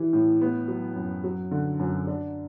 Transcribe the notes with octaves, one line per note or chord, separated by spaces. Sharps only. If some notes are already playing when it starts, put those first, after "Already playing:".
Already playing: E3 G3
A2
B3
F#3
F#2
F#3
D3
F#2
D4